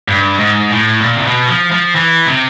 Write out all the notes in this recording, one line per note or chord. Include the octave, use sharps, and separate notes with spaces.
G2
G#2
A2
A#2
C3
B2
F3
F3
E3
C3